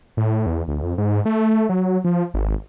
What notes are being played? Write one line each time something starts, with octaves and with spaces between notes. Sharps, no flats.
A2
E2
D2
F2
G#2
A3
F#3
F3
G#1